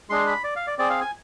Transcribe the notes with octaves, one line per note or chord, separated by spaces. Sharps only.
G#3 D4 G#4 C6
B5
D5
F5
D5
C4 G#4 D5
F5
G#5